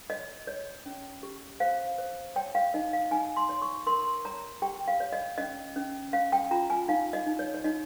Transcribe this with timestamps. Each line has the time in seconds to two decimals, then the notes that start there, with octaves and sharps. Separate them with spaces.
0.10 C#5 D#5
0.47 C#5
0.86 C#4
1.23 G4
1.60 C5 F5
1.98 C5
2.36 C#5 G5
2.55 F5
2.74 D#4 D#5
2.93 F5
3.11 D#4 G#5
3.36 C6
3.49 C#5
3.62 C#6
3.86 A#4 C6
4.25 C#5 A#5
4.62 G4 G5
4.88 F5
5.00 C#5
5.13 D#5
5.38 C#4 D#5
5.76 C#4
6.13 C#4 F5
6.32 G5
6.51 F4 A#5
6.70 G#5
6.88 D#4 F5
7.13 D#5
7.26 D#4
7.39 C#5
7.54 C#5
7.64 D#4 D#5